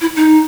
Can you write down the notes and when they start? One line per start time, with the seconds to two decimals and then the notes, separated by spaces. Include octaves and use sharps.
0.01 E4
0.16 D#4